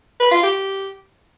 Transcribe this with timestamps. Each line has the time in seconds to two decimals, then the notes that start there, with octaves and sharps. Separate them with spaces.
0.20 B4
0.31 F4
0.43 G4